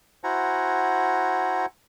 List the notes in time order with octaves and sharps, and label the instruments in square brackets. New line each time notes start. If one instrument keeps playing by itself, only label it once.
[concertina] E4 F#4 C5 F#5 G#5 A#5